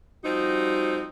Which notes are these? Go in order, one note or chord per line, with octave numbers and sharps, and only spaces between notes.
F3 G3 C4 D#4 F#4